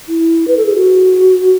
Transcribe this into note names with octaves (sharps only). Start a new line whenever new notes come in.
E4
B4
A4
G#4
F#4